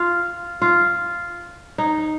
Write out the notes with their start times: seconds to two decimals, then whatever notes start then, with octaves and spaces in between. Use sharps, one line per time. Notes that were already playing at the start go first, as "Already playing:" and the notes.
Already playing: F4
0.62 F4
1.78 D#4